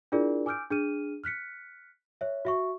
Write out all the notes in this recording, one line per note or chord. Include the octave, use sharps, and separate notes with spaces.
D4 E4 F4 G#4 A#4 D5
G#5 D6 E6 F6 G6 D7
D4 G#4 F6 D#7
F6 F#6 B6 C#7
C#5 E5
F#4 E5 C#6